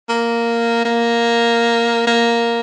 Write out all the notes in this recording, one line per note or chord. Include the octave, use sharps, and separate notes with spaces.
A#3
A#3
A#3